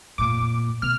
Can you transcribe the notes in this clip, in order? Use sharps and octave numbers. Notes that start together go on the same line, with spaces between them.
F2 A#2 D6
B2 F6